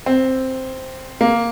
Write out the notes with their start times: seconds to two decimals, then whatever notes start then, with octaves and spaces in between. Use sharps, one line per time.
0.06 C4
1.21 A#3